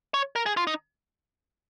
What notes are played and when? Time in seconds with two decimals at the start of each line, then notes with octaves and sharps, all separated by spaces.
0.14 C#5
0.36 A#4
0.46 G#4
0.57 F4
0.67 D#4